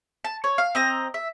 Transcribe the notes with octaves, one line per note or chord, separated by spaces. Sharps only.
A5
C#5
F5
C4 D#5 A#5
E5